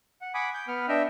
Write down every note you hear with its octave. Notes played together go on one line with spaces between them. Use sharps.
F#5
F#5 G#5 B5 D6 D#6
G6
B3 B4 F#5 F6
D4 D#5 E5 G5